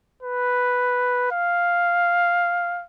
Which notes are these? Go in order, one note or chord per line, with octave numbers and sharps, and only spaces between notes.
B4
F5